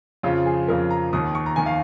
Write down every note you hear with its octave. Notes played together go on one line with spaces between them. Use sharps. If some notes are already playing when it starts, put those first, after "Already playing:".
F2 C#3 F3 F4
G#4
F2 C#3 F3 A#4
A#5
D#2 D#3 D#6
C#6
A#5
D#3 G#5
F5